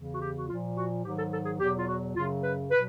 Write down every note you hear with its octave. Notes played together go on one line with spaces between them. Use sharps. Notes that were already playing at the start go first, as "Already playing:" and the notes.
Already playing: E2 C#3 E3
F#4
G4
F#4
A#2 F3 F4
F#4
G#2 D#3 F#3 G4
A4
A4
G#4
E2 B2 F#3 G4
F4
F#4
F#2 C#3 F#3 F4
B4
B2 F#3 B4